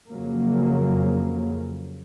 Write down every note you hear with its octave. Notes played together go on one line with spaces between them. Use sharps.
F2 C#3 F#3 A#3